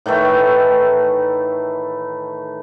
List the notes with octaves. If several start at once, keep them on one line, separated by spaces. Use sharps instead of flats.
A2 D#3 E3 A3